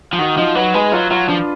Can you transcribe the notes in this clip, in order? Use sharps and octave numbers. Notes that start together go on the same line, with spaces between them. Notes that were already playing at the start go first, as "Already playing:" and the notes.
F3
D#3 F#4
F3 D#4
F#3 B4
G#3 B4
F#3 F4
F#3 F4
F3 D4